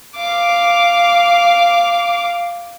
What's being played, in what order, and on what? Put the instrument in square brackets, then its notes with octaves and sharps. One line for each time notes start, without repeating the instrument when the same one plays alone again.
[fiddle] F5 D6